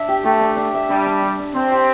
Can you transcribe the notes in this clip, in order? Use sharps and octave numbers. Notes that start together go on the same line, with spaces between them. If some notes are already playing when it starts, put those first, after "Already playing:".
Already playing: D4 E5
G4
A3 G4
D4
D4
E5
G3 D4
D4
D4
D4
C4 D4
G4